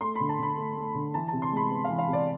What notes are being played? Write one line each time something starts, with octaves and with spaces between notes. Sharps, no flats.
A3 C6
D3 B5
A5
D3 B5
A3
A3
D3
E3 A5
C3 A5
C6
G#3 B5
B3
E3 F5
F5
C3
D5